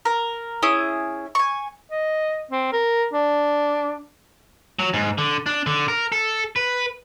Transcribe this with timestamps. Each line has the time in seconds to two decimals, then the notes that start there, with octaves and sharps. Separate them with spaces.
0.05 A#4
0.63 C#4 E4 G#4 D#6
1.35 G#5 C#6
1.90 D#5
2.51 C4
2.73 A#4
3.13 D4
4.79 F#3
4.94 G#2
5.18 D3
5.46 D4
5.66 D3
5.88 A#4
6.12 A4
6.56 B4